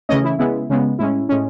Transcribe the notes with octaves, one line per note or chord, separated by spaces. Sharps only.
C#3 E3 A3 C#4 D#5
E4
C#3 G#3 B3 E4
C#3 G#3 B3
A2 G#3 C#4 E4
A2 G#3 C#4